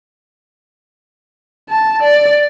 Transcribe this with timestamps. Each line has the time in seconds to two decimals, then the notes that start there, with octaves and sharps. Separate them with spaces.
1.69 A5
2.03 D5